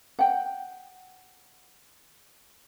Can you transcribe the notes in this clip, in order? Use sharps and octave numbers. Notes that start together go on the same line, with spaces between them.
F#5 G5